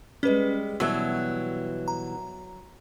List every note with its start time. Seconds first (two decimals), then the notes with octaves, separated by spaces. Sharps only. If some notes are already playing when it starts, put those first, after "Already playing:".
0.23 G3 G#3 C#4 B4
0.80 B2 E3 F#3 G3 E6
1.88 A#5